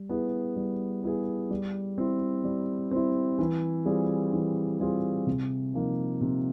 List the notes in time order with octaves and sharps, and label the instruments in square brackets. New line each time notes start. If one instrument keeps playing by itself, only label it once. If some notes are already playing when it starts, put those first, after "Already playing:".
Already playing: [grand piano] G3
B3 E4 G#4
G3
B3 E4 G#4
G3
C4 E4
G3
C4 E4
E3
G3 C4 F4 G#4
E3
G3 C4 F4 G#4
C3
F3 A#3 D#4
C3